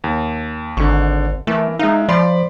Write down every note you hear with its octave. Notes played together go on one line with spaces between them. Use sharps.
D#2
G#1 D3 C#6
E3 A3 A#4
G#3 D#4 E5 F5
F3 D5 B5 C6